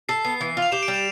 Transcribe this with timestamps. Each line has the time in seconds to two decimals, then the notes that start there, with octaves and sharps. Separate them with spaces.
0.09 A4 C7
0.25 B3 C7
0.41 E3
0.57 F4
0.62 F7
0.72 G4 E7
0.83 D7
0.88 G3
0.94 E7